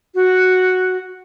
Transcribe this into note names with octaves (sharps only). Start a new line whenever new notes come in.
F#4